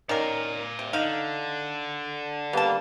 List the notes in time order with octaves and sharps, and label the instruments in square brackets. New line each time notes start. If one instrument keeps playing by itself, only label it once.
[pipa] D#3 C#4 A#4 [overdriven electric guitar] D5 F5
[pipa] C3
[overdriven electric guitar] D3 [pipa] D#4 F5
[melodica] G3 A#3 [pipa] B3 A5